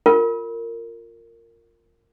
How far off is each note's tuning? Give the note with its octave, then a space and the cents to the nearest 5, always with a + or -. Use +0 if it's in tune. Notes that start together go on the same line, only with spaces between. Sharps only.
F4 +0 A#4 -20